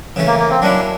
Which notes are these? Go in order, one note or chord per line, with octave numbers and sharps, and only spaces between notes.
C#3 E3 A3 C#4
A#3
A#3
C4
F#3 A#3 C#4 D4 E4